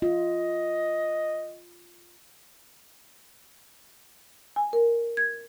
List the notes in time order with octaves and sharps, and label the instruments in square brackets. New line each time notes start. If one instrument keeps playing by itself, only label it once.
[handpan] F4 [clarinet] D#5
[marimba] G#5
A#4
G#6